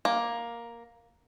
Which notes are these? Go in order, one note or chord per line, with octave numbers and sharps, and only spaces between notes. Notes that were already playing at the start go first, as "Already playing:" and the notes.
A#3